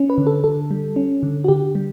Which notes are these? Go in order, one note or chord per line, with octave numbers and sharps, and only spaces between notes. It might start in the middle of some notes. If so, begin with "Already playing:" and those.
Already playing: C#4
B4
D3
A4
D3 A4
G3
C#4
D3
F#4
D3 G4
G3